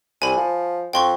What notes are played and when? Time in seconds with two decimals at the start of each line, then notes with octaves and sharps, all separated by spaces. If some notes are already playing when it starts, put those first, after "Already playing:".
0.22 C2 G#5 B5
0.37 F3
0.93 F2 G5 C6 C#6